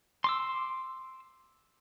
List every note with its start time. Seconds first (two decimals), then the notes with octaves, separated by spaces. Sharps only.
0.24 C6 D6 E6